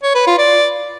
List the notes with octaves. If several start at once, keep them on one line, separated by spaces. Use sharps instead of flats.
C#5
B4
F4
D5